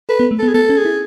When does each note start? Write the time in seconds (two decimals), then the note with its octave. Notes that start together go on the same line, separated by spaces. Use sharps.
0.09 A4 B4
0.20 B3
0.31 A3
0.39 B3 A4
0.48 G#4
0.54 B3 A4
0.69 C#4
0.77 G#4
0.85 E4